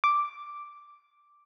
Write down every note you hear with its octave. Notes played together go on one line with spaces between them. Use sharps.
D6